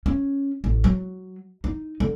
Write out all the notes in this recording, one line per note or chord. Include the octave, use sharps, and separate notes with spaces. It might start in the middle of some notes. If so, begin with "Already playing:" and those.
C#4
A1
F#3
D#4
D3